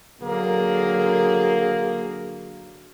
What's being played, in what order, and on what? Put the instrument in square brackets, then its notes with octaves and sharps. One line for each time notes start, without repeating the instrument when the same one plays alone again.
[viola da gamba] D3 F#3 G#4 [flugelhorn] A#3